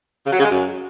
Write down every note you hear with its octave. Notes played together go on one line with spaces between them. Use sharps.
C#3
F#3
C#3
G#3
F#2